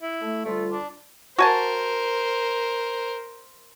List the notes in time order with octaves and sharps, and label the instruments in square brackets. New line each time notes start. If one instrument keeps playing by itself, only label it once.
[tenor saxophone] E4
[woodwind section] A3
[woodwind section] D2 G3 F4 [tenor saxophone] A3
[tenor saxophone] D4
[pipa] F#4 G#5 A5 [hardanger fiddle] A#4 C5